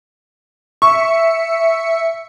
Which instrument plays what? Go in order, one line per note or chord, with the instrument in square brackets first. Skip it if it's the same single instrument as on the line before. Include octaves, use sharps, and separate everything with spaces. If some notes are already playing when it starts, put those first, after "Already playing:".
[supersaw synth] E5 C#7 [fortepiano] C#6